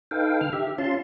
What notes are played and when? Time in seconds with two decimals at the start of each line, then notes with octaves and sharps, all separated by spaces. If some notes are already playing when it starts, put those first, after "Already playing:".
0.11 D#4 A4 B4 F5 G5
0.41 D3 F6
0.53 G4 E5
0.78 C#4 F4 A5 C6